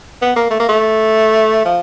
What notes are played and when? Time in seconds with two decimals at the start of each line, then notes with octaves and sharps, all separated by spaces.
0.22 B3
0.36 A#3
0.51 A3
0.60 A#3
0.69 A3
1.65 F3